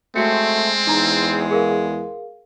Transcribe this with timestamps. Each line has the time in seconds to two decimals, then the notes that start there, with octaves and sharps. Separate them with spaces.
0.16 G#3 A3 C4 F#4 C#7
0.87 E2 D#4 A#5
1.51 G#4 A#4 F5